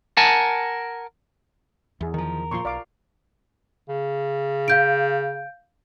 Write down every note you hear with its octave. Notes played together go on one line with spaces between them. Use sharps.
A#4 F#5 G#5 A5
E2 E4 G#4
D#3 F3 A#4
A#2 F3 F4 C6 C#6
B1 D5 F5 D6
C#3
F5 G6 D7